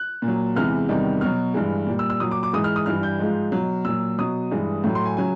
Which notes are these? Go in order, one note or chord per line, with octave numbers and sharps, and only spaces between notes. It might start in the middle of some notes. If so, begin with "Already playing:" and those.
Already playing: F#6
A#2
F#3
E2 C3 E3 G#3 F6
E2 C3 D#3 G3
B2 F#3 F6
G2 E3 G#3
A#2 G3
E6
E6
A#2 F#3 D#6
D6
D6
G#2 E3 G#3 D#6
F6
D#6
G2 E3 G3 F6
G6
G#2 F3 G#3
B2 F#3
A#2 F#3 E6
B2 F#3 D#6
G2 E3 G#3
A2 F#3
C6
G#5
C#3 F#3 G#5